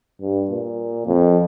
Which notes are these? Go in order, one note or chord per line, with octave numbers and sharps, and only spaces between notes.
G2
A#2
F2